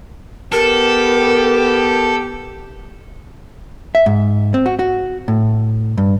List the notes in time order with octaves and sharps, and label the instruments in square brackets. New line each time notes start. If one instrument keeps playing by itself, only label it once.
[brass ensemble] B3 G4 [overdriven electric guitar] A4 [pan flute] A#4
[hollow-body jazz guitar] E5
G#2
C4
F#4
F#4
A2
G2